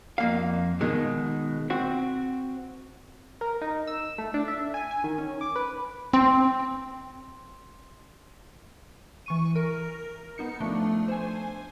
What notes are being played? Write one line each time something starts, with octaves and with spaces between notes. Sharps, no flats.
F2 A#3 F5
B2 D#3 G#3
C4 F#4
A#4
D#4
E6
A3
D4
E5
G#5
G#5
D#3
C#4
D6
B4
C4 C6
E3 C#6 D#7
A#4
B3 D#4 C#7
F3 A3 D4
C5 G#5